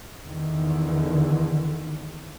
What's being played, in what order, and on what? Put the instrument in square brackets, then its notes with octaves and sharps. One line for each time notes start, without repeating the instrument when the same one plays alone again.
[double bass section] E2 D3 D#3